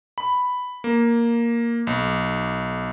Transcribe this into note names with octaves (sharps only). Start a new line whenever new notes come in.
B5
A#3
B1